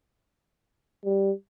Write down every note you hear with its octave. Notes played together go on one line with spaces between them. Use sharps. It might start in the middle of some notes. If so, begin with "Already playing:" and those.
G3